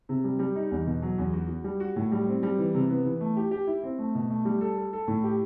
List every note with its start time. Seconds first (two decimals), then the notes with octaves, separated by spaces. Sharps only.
0.09 C3
0.24 G3
0.39 G3
0.55 D#4
0.71 E2
0.86 B2
1.02 F#3
1.18 E2
1.33 F#4
1.49 F#4
1.64 G3
1.80 F#4
1.96 A2
2.12 G3
2.27 C4
2.43 G3
2.58 E3
2.74 C3
2.90 B3
3.05 E3
3.21 A3
3.37 G4
3.51 G4
3.67 E4
3.83 C4
3.98 A3
4.15 B2
4.30 A3
4.45 G3
4.61 A4
4.77 A4
4.93 A4
5.08 A2
5.24 G4